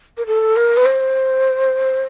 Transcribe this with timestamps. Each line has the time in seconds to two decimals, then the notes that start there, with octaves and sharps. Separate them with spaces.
0.17 A#4
0.26 A4
0.56 A#4
0.77 B4
0.85 C5